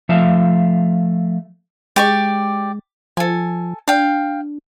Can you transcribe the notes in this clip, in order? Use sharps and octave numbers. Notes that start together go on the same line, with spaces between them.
F3 A3 E5 F5
G#3 G4 D5 C#6
F3 A4 G#5
D4 F5 G5